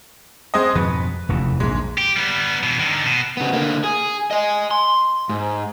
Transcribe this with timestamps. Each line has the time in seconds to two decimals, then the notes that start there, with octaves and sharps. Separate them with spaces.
0.54 G#3 C4 D#5
0.75 F2 G#2 B2 B4
1.29 F1 E2 C#3
1.60 A#1 G#2 G#3
1.98 G4
2.16 G3 B3
2.63 B2 E3
2.80 D3 D#3
3.06 B2
3.37 C#3 B3
3.53 D3 A#3
3.84 G#4
4.31 D#5 G#5
4.71 C6
5.29 G#2